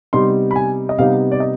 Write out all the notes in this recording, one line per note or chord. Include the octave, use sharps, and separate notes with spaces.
C3 G3 B3 D#4 C6
B5
G#5
D#5
C3 G3 B3 D#4 F5
D5
D#5